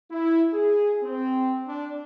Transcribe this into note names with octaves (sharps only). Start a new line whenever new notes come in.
E4
G#4
C4
D4